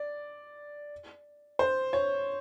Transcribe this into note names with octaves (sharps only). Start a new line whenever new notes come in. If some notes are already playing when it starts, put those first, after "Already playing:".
Already playing: D5
C5
C#5